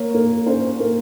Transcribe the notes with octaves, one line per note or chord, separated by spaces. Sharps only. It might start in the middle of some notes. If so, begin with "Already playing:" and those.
Already playing: A#3 C#5
A#3
C#4 C5
A#3